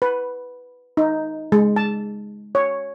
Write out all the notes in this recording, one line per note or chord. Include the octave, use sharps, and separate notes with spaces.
B4
D#4
G#3
A5
C#5